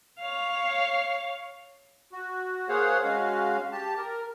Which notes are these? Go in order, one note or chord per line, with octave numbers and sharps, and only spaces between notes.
C#5 F5
F#4
A#3 G#4 C5 C#5 F5 F#5
G#3 C#4 F#4 F5
G4 A5
A#4